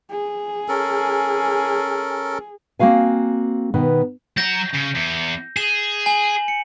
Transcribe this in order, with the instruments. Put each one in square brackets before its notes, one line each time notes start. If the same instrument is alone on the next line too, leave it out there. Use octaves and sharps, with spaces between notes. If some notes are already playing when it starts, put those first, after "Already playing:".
[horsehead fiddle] G#4
[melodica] C#4 A4 A#4
[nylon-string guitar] A#3 C4 F#4 F5 G#5
B2 D#3 B3
[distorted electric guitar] F#3 A#5 [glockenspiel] G6 A#6
[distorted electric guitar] C#3
E2
[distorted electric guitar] G#4 [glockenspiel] E7 G7
[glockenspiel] G#5 F#7
C#7